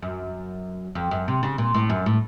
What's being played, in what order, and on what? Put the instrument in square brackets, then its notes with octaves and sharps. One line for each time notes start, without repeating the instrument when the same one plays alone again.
[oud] F#2
F2
F#2
C3
C#3
A#2
A2
F#2
A2